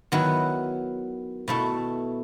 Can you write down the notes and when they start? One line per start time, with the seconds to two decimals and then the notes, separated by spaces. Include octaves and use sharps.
0.12 D#3 F#3 B3 E4 B4
1.48 B2 A3 E4